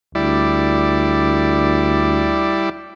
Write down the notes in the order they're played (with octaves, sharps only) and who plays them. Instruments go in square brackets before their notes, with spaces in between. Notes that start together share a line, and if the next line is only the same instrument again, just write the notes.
[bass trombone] D2 [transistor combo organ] G3 E4 D5